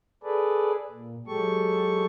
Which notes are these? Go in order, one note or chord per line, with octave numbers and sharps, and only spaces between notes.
G#4 A4 B4 D5
A#2
F#3 G#3 G4 A4 C#6